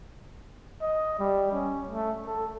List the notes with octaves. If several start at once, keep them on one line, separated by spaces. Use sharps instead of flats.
D#5
G3
C#4
A3
A4